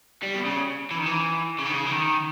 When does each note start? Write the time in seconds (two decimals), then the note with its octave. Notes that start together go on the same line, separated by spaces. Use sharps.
0.23 G3
0.35 B2
0.46 C#3
0.91 E3
0.98 D#3
1.06 E3
1.59 C#3
1.66 D#3
1.73 C#3
1.86 E3
1.92 D#3